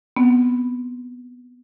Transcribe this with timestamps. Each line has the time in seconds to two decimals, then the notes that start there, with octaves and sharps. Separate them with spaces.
0.17 B3 C4